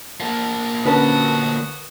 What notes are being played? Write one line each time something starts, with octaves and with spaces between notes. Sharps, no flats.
F3 A#3
D3 C#4 F#4 A#4 B4 A5 D#6